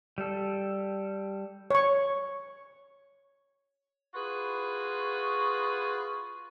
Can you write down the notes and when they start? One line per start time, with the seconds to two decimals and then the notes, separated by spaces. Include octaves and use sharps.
0.18 G3 A4
1.70 C#5 C#6
4.15 F4 F#4 G#4 B4